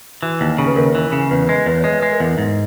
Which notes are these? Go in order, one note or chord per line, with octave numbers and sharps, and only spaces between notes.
E3 F#4
D#2
C#3
B4
D#2 A#4
E3
C#3
E2 B4
G#3 B4
E2 B4
C#5
G#3 B4 D#5
E5
G#3 B4 D#5
A#4
E2 G#4
G#2